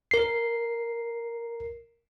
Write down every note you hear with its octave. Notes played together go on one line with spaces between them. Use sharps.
A#4 C7